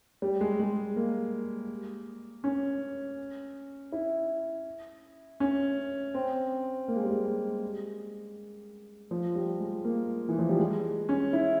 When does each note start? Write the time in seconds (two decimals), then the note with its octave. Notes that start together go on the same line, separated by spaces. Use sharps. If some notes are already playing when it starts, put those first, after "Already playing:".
0.22 G3
0.41 G#3
0.59 G#3
0.96 A#3
2.44 C#4
3.92 E4
5.40 C#4
6.14 C4
6.88 A#3
6.96 G#3
7.03 G3
7.10 G#3
9.11 F3
9.35 G3
9.60 G#3
9.85 A#3
10.29 E3
10.39 F3
10.49 G3
10.59 G#3
11.09 C#4
11.33 E4